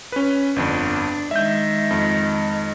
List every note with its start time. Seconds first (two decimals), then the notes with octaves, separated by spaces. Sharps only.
0.12 C#4 B4
0.56 G1 F2 D4
1.31 D#3 G#3 E5 G6
1.91 F2